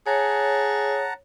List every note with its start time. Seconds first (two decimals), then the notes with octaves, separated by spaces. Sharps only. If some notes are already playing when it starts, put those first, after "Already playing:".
0.06 G#4 C#5 F#5 A5 A#5